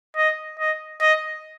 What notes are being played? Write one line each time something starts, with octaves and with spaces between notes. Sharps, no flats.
D#5
D#5
D#5